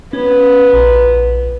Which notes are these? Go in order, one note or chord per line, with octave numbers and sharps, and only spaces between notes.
B3 C#4
A#1